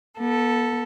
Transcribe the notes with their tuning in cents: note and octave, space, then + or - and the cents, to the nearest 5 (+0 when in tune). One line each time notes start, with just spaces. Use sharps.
B3 -40 A4 +0